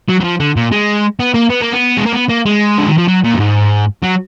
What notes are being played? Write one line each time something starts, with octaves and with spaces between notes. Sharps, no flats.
F#3
F#3
F3
D3
A#2
G#3
B3
A#3
B3
A#3
B3
G#3
A#3
B3
A#3
G#3
D3
D#3
F3
F#3
A#2
F#2
G#2
F#3